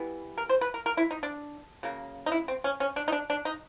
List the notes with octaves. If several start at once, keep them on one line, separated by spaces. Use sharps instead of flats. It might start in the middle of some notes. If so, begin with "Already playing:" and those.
Already playing: E3 G3 B3
A#4
C5
B4
A#4
A#4
E4
D#4
D4
C#3 F#3 A#3
D#4
E4
C4
C#4
C#4
D4
D#4
D4
D4
D#4